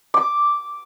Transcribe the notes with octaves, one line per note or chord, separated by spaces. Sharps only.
D6